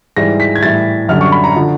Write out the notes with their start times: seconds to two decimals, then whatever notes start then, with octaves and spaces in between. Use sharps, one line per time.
0.17 G#2 E3 G3 A#6
0.40 B6
0.55 G#6
0.63 A2 E3 G3 A6
1.08 F#2 D3 G3 F6
1.21 C#6
1.32 B5
1.44 A#5
1.56 D3 F3